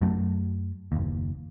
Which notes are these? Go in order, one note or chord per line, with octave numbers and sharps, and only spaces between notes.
F#2 F#3 A3
F#1 D#2